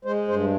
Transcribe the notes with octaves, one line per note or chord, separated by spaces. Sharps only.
G#3 C5
G2 C5